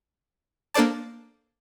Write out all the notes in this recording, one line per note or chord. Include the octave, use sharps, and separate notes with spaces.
A#3 D4 A4 C5 D5 A5